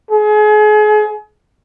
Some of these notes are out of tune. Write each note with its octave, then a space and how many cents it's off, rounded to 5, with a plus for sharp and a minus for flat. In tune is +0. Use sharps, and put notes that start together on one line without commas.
G#4 +35